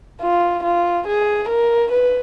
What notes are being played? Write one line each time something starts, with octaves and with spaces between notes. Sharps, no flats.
F4
F4
G#4
A#4
B4